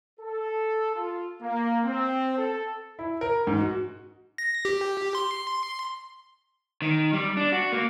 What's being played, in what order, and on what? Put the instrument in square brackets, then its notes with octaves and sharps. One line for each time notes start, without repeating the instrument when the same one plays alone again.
[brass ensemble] A4
F4
A#3
C4
A4
[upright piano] E4
A#4
G#2
F#4
[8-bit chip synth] A#6
G4
C6
[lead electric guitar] D#3
G3
D4
F#4
A#3